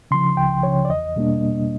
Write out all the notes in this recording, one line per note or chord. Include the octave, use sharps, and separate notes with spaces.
C#3 F3 C6
C#2 G5
C#3 F3 C#5
D5
E2 D#5
B2 G3 A#3 D4